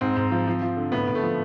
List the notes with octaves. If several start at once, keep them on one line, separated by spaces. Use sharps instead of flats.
G#2 C4
G#2
F3
F3
F3
D3
A2 B3
A2
A3
F3